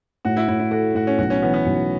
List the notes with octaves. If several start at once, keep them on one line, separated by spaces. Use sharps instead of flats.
A2 F#4
E4
A2 E4
E4
F#4 A4
A2 F#4
C#4
B1 F#4
C#4
E3 B3
B3
B1